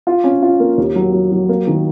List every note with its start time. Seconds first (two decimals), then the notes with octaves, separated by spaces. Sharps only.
0.07 F4
0.24 C#4
0.43 F4
0.60 A#3
0.78 D#2
0.96 F#3
1.13 F#3
1.32 F#3
1.49 A#3
1.67 D#3